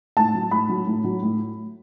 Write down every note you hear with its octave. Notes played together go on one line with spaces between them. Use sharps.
A2 A5
F#3
A2 B5
F#3
A2
F#3
A2